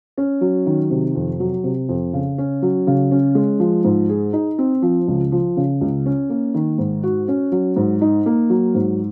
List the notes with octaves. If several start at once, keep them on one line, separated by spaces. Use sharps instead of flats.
C#4
F#3
D#3
C3
F2
F#3
C3
F2
C#3
C#4
F#3
C#3
C#4
G#3
F3
G#2
G#4
D#4
C4
F3
C#2
F3
C#3
C#2
C#4
A#3
D#3
G#2
F#4
C#4
F#3
G#2
D#4
A#3
F#3
G#2